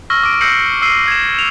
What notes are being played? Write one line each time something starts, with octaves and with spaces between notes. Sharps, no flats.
C#6 E6 F6 A#6
D6 D7
E6 G6 A#6 C7 C#7 F#7
E6 F6 C7 D#7
G#6 E7
E7 F7